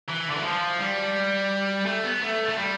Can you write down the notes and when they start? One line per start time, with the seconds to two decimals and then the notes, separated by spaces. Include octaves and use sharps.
0.09 E3
0.30 D3
0.37 E3
0.44 F3
0.79 G3
1.86 A3
2.04 B3
2.22 A3
2.49 A3
2.58 G3